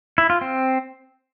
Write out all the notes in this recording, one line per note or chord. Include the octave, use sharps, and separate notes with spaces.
E4
F4
C4